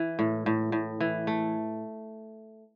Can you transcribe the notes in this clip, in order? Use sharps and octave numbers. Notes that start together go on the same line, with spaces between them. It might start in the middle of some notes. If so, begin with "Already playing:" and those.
Already playing: E3
A2
A2
A2
E3
A3